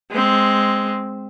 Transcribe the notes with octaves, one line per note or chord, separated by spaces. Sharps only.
G#3 C4